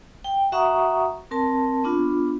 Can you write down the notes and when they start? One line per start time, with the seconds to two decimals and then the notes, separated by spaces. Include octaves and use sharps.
0.24 G5
0.52 F#4 E5 F#5 A#5 C#6 D#6
1.31 C4 A#4 A5
1.84 B3 D4 F4